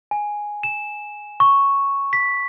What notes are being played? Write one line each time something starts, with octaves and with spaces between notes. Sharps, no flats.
G#5
E7
C#6
B6